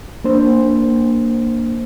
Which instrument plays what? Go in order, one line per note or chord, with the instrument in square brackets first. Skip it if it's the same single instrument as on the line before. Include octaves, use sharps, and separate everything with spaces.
[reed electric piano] A#3 D4 C5